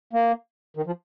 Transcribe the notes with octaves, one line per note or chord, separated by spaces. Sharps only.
A#3
D#3
F3